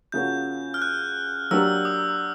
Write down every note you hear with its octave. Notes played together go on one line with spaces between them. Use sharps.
C#3 F3 A#3 C#4 F#4 G6
F6
F#6
F#3 A#3 D4 G4 A#4 E6
D#6